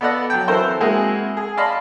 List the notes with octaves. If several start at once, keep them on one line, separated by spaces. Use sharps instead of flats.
B3 A4 D5 D#5 F#5 B5
F#3 G5
E3 C4 A4 A#4 C5
G#3 A#3 C4 E4 F#4 G#4
G#4
D5 D#5 F5 A5 B5 C6